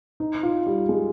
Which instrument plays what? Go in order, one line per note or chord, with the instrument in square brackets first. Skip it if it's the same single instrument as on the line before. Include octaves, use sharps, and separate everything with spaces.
[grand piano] D#4
F4
G3
G#3